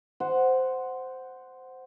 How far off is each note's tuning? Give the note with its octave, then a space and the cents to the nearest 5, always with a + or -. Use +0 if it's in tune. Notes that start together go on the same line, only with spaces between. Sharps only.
C5 -5 F#5 +0